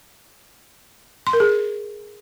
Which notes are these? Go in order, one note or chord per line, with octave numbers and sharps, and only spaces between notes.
C6
A#4
G#4